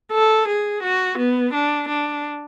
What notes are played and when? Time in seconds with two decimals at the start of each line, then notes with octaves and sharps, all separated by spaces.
0.12 A4
0.48 G#4
0.83 F#4
1.18 B3
1.53 D4
1.88 D4